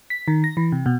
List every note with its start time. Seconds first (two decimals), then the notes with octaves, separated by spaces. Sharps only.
0.10 B6
0.28 D#3
0.44 A#6
0.57 E3
0.72 C3
0.86 B2